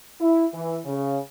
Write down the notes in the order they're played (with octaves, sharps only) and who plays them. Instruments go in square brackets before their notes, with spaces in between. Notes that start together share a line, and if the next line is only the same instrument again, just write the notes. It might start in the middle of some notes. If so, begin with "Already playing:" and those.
[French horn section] E4
E3
C#3